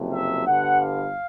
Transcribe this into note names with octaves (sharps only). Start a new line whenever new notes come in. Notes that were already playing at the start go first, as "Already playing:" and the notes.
Already playing: F#1 F2 C3
E5
G1 G2 D3 F#5
F5